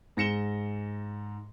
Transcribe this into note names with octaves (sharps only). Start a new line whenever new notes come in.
G#2 A#6 C#7 E7 G7